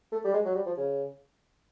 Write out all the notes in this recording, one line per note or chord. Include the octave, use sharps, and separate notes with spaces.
A3
G3
G#3
F#3
G3
F3
C#3